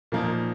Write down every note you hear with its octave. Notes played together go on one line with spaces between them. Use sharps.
A#2 F3 A#3 D#4